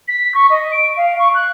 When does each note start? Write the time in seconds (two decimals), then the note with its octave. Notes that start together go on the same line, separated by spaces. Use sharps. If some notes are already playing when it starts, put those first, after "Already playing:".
0.07 B6
0.34 C#6
0.49 D#5
0.71 D7
0.96 F5
1.18 C#6
1.34 F#6